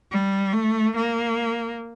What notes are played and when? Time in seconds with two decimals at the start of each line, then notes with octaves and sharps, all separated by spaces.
0.11 G3
0.53 A3
0.96 A#3